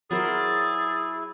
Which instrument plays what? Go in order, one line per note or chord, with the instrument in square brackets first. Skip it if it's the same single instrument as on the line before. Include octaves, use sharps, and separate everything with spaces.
[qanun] F#3 A#4 C5 [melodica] E4 [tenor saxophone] G#4 [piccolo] A6